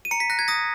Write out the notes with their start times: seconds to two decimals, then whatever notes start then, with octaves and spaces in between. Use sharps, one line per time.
0.05 D#7
0.11 A#5 C#7
0.20 B6
0.30 F#6 A#6
0.39 G#6
0.48 D#6 A#6